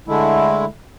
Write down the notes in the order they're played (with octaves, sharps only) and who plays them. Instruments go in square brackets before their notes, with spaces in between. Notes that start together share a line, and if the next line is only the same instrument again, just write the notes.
[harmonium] D3 G#3 A3 E4